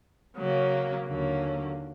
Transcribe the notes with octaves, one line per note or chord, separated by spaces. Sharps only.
C#3 F#3 A#3 C#4
D#2 D3 F#3 A#3 C#4